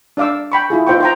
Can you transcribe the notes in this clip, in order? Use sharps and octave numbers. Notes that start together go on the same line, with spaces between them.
D4 D5 F5 D6 E6
G5 B5 C#6
E4 F4 G#4
D#4 F4 C5 E5 G5 C#6
C5 G5 A#5